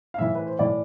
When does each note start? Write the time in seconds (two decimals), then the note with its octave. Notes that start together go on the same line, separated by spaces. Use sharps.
0.14 F5
0.18 A2 E3 E5
0.35 B4
0.47 C5
0.59 A2 E3 D5